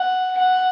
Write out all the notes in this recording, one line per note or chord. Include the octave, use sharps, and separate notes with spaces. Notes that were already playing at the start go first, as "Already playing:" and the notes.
Already playing: F#5
F#5